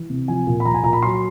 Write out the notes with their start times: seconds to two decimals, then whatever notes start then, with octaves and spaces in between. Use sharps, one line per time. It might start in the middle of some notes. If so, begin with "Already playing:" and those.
Already playing: E3
0.10 C3
0.28 F3 G#5
0.47 A#2
0.60 B5
0.65 F3 A#5
0.74 G#5
0.83 A#2 A#5
0.93 B5
1.03 F#3 C6